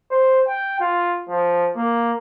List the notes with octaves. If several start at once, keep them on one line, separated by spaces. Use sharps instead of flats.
C5
G5
F4
F3
A#3